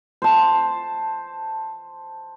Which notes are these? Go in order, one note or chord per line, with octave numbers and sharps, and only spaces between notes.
C5 A5